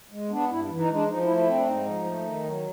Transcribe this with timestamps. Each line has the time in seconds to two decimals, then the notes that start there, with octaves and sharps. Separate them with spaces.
0.12 G#3
0.30 B3 D4
0.50 G2 E4
0.70 E3
0.79 D#4
0.89 G#3
0.94 D4
1.08 F3 D#4
1.23 E4
1.28 A3
1.38 E4
1.47 C4
1.55 D4
1.66 G#2 D#4
1.86 F3
2.05 A3
2.25 D#3
2.44 F#3